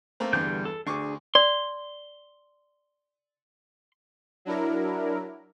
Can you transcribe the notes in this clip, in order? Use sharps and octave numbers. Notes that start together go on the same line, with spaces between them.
A3 A#3 C4
E2 G2 D3 G3 G6
A4
D2 D4 G#4 C#6 D6
D5 C6
F#3 D4 E4 A#4